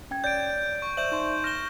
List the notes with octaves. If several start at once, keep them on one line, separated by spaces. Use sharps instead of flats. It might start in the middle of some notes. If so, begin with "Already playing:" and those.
C#4 G5 G#6
C#5 D5 G6 A6 D7
C#6
C5 D5 E5 G6 E7 F#7
D#4 C6
F6 G6 A#6 E7 G7